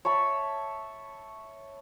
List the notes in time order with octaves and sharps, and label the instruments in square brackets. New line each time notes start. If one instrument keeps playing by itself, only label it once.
[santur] C#5 E5 A5 B5